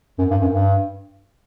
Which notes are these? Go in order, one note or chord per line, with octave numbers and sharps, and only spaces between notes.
F#2
G2
F#2
G2